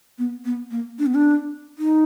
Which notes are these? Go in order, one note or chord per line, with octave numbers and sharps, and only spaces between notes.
B3
B3
A#3
D4
B3
D4
D#4